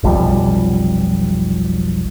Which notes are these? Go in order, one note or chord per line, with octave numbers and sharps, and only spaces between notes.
F1 B1 F3 G3